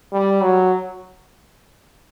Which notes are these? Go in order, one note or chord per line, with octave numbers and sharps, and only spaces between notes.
G3
F#3